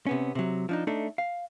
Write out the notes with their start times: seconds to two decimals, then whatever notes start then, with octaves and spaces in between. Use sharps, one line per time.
0.07 C3 B3 C#4
0.35 C3 F#3
0.69 F3 D4 D#4
0.87 A3 D4 D#4 A4
1.18 F5